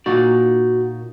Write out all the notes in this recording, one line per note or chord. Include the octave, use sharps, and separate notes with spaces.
A#2 D#4 F#4 D5